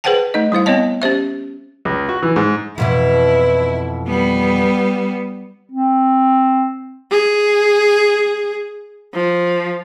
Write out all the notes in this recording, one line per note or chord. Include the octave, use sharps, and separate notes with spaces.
G#4 B4 C5 F#5 G5 A5
A3 D#4 D#5
G3 E4 C5 F5
B3 C4 C#5 D#5 A5
C#4 G4 C5 E5
C#2
F#4
E3
G#2
F2 B2 E3 E4
G3 B3
C4
G#4
F3